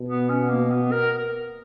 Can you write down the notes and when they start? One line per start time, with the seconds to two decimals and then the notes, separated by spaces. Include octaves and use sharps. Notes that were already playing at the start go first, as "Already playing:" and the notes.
Already playing: B2
0.08 B3
0.29 C#4
0.50 A#3
0.70 B3
0.91 A#4